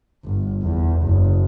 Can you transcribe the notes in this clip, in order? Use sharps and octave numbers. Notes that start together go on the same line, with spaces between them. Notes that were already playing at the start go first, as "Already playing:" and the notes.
G1
E2
F#1